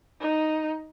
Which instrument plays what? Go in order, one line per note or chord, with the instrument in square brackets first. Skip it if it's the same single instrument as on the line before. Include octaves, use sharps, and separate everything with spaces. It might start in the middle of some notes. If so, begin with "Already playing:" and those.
[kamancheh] D#4